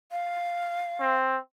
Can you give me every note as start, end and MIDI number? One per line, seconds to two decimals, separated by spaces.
0.12 1.15 77
1.00 1.38 60